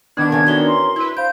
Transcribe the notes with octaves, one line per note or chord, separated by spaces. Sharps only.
D#3 B3 D4 G#6
G2 C#3 F#3
E3 C#4 F#4 A#4 G7
C6
D4 E4 B4
C5 F5 B5 G6 D7